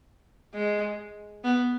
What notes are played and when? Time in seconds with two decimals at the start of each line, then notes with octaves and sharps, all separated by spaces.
0.54 G#3
1.44 B3